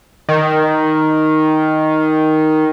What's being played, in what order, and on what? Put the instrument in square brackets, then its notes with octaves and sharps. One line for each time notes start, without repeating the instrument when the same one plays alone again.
[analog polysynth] D#3